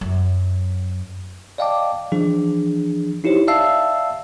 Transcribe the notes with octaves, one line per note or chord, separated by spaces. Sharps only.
F#2
D5 D#5 F5 G5 A5 D6
E3 F3 D4 G#4
D#4 E4 G4 C5 C#5
D5 E5 F5 A5 E6 C7